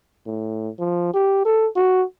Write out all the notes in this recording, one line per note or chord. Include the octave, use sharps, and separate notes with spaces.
A2
F3
G4
A4
F#4